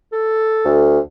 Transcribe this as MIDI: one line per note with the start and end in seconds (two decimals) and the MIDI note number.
0.12 0.88 69
0.65 0.99 38